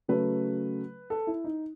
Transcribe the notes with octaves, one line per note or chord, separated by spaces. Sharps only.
C#3 F#3 A3 B4
A4
E4
D#4